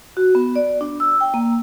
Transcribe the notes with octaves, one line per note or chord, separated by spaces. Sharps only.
F#4
B3
D5
D4
E6
G5
A#3